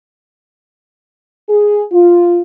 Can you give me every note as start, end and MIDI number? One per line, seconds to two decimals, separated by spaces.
1.49 1.83 68
1.92 2.41 65